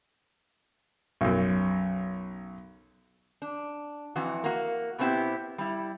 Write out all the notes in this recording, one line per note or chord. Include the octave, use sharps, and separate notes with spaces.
B1 F#2
D4
F2 E3 F#4
A#3 F#4
B2 A3 B3 C4 E4 G4
G3 E4